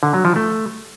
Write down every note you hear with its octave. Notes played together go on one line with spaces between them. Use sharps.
D3
F#3
F3
A3